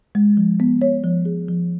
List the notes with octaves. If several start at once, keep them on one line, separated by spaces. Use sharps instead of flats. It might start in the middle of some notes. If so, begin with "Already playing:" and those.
G#3
F3
B3
C#5
F3
G#4
F3